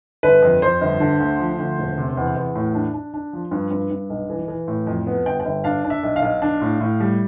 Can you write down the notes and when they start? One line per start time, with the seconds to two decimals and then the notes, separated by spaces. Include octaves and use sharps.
0.23 G1 B4
0.42 F2
0.62 F2 C5
0.81 G1
1.00 D3
1.20 D2
1.39 F3
1.59 D2
1.78 E1
1.98 C3
2.17 E2
2.36 E2
2.55 A2
2.75 D4
2.94 D4
3.14 D4
3.33 F3
3.51 G2
3.71 G2
3.91 G2
4.10 B1
4.30 E3
4.48 E3
4.68 A2
4.87 F2
5.07 B3
5.26 G1 G5
5.40 G5
5.45 G1
5.64 D4 F5
5.85 D4
5.90 E5
6.03 B1
6.16 F5
6.22 B1
6.42 D4
6.61 A2
6.80 A2
7.00 G3